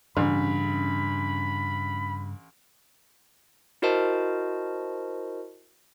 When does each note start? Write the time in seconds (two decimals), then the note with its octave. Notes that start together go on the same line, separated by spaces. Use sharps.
0.17 A1 G2 C#3 D4 B5
3.82 E4 F#4 A#4 C5 D#5 A5